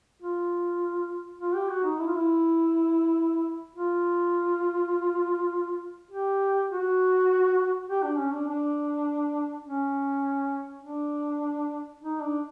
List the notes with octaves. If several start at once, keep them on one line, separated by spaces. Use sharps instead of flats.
F4
F4
G4
F#4
D#4
E4
F4
E4
F4
G4
F#4
G4
D4
C#4
D4
D4
C#4
D4
D#4
D4